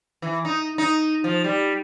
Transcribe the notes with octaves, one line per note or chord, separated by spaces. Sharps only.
E3
D#4
D#4
F3
G3